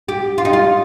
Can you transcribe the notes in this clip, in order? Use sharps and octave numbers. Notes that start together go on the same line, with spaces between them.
G4
F4
D#4
F4